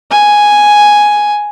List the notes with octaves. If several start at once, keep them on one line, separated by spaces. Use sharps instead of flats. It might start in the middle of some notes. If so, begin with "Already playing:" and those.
G#5